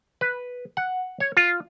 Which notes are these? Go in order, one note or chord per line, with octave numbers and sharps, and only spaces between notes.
B4
F#5
C#5
F4